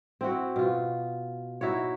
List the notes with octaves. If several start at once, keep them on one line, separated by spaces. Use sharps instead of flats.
C4 E4 F#4
B2 F4
D#4 E4 F#4 C#5